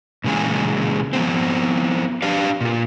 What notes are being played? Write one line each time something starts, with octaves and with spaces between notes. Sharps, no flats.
A#2 C#3 E3 G#3 G#4
F3 B3 C4
D4 G4 B4 D5 F5
A#2 F4